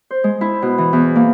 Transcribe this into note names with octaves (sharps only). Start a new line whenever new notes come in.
C5
G#3
E4
B2
E3
E2
A#3